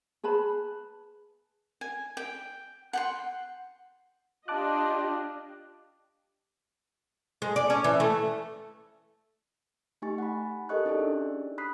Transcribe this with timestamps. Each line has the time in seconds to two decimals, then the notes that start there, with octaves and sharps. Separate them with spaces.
0.24 G#4 B4 A5 B5
1.81 G#5
2.17 G5
2.93 F#5 G5 C6
4.48 D4 F4 G4 D#5 A5 D6 F#6
7.42 G#3
7.56 D5
7.70 C#4
7.84 E3
8.00 A3
10.02 A3 D#4 G4 G#5 C#6 A6
10.18 F#5 B5
10.69 G4 A4 A#4 D#5 C#6 F#6
10.85 C#4 D#4 E4 G4 G#4 D5
10.99 D4
11.58 B5 D#6 F#6 B6 C7